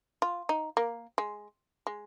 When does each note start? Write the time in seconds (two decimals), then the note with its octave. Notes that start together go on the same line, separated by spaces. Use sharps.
0.22 F4
0.49 D#4
0.77 A#3
1.18 G#3
1.87 G#3